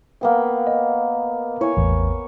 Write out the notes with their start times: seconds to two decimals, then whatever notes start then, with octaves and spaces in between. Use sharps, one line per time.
0.21 A#3 B3 G5
0.67 D#5
1.61 E4 C#5 G#5
1.77 A1 E2